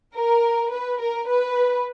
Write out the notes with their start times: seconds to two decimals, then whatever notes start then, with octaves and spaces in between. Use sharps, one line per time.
0.14 A#4
0.71 B4
1.00 A#4
1.28 B4